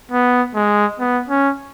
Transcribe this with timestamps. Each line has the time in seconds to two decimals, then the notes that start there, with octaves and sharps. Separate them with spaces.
0.11 B3
0.55 G#3
0.99 B3
1.29 C#4